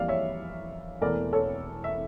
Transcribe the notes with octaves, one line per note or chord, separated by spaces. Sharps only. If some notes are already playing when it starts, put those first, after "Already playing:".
Already playing: F2 E3 G3 A#3 D5 F5
C#5 E5
E1 E2 E3 A3 A#4 D5
A4 C#5
E5